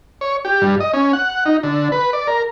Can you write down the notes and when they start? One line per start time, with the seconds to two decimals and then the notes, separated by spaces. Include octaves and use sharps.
0.21 C#5
0.45 G4
0.62 G2
0.80 D#5
0.94 C#4
1.13 F#5
1.46 D#4
1.63 D3
1.92 B4
2.13 D5
2.27 A#4